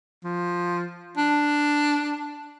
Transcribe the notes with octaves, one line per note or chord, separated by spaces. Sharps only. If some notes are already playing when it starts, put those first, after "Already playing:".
F3
D4